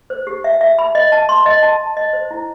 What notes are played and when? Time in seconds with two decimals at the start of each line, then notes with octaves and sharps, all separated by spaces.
0.10 C5
0.27 G4
0.44 E5
0.61 E5
0.79 B5
0.95 D#5
1.12 A5
1.29 C6
1.46 D#5
1.63 A5
1.80 A5
1.97 D#5
2.13 C5
2.31 E4